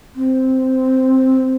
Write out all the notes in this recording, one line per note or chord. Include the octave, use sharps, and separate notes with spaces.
C4